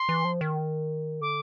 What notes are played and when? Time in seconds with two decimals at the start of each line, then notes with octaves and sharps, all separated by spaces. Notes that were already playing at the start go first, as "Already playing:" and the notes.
Already playing: C6
0.09 E3
0.25 F3
0.41 D#3
1.21 D3 D6